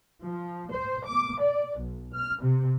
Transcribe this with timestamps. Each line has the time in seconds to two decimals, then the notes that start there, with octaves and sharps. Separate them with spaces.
0.24 F3
0.72 C5
1.06 D6
1.41 D5
1.79 B1
2.13 F6
2.42 C3